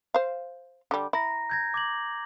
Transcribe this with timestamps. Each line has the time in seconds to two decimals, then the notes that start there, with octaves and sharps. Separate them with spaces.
0.14 C5 F5
0.91 D3 G3
1.13 E4 A#5 A#6
1.50 G6 G#6 A#6
1.74 D6 G#6 F#7